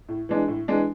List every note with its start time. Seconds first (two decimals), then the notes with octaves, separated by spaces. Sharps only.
0.09 A2
0.29 E3 G#3 D4
0.48 A2
0.68 E3 G#3 D4